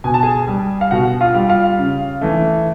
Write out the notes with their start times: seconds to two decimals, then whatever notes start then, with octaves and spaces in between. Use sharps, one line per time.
0.04 B2 G#5
0.14 A5
0.23 G#4 G#5
0.47 G3
0.81 F5
0.91 B2 F#4 F#5
1.21 F4 F5
1.34 G3
1.49 F4 F5
1.78 C#3
2.21 E3 A3